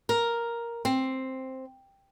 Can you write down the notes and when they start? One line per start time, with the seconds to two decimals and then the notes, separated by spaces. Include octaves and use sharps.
0.09 A#4
0.85 C4